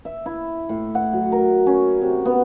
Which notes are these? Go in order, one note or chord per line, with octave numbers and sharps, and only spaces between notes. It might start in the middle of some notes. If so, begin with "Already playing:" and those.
E5
E4
A2
F#5
F#3
A#4
C#4
C3
B3